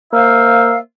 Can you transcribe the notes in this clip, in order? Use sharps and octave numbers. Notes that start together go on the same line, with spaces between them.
A#3 C5 E5 F5